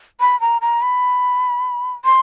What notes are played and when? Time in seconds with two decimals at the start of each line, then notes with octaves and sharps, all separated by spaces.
0.20 B5
0.41 A#5
0.62 A#5
0.82 B5
2.05 C6